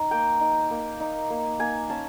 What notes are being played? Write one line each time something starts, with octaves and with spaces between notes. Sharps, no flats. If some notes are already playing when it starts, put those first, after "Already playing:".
Already playing: D#4
A#3 G5
D#4
A#3
D#4
A#3
A#3 G#5
C#4 A5